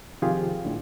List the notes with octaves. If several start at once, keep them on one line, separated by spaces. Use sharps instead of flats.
C3 D#3 F3 F4 G4 G#4
A2 D3